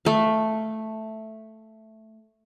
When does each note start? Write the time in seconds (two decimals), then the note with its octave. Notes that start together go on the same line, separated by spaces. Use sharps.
0.05 A3 F5